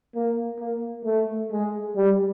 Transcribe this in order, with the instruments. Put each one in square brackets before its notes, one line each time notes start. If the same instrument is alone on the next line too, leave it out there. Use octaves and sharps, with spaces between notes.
[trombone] A#3
A#3
A3
G#3
G3